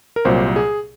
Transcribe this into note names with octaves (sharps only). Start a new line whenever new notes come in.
A#4
C2 A#2 F#3 C5
G#4